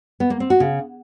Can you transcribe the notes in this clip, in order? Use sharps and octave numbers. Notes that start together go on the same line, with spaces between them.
B3
A#3
C4
F#4
C#3